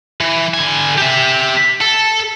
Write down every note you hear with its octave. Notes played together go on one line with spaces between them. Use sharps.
E3
D3 G#5
G4 E5
A4